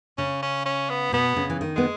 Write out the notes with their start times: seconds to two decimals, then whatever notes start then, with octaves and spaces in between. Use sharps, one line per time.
0.18 C#3 C#4
0.42 C#4
0.65 C#4
0.90 B3
1.12 B2 B3
1.36 C#3
1.50 E3
1.61 D#3
1.76 G#3 B3